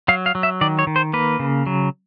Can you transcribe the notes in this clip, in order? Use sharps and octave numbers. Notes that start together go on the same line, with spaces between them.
F#3 F5
F5
F#3
E5
D#3 D5
C#5
D#3
C5
A#3 B4
C#3
F#3